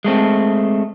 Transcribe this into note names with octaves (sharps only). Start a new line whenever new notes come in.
G#3 A3 C4